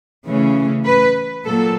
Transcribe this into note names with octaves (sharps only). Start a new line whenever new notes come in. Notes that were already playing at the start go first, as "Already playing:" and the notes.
C#3 E3 A3 C#4
B4
A#2 F#3 A#3 A4